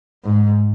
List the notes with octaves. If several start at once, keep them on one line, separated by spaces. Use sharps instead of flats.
G#2